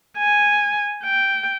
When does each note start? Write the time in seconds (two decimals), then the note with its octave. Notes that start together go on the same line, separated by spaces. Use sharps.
0.17 G#5
1.04 G5